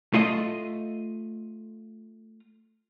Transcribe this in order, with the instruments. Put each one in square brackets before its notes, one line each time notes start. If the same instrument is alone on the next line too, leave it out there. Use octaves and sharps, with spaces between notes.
[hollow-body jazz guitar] A3 F4 D#5